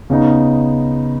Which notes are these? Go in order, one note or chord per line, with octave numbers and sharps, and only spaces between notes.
C#3 B3 D#4